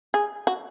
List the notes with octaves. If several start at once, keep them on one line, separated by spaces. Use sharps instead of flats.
G#4
F#4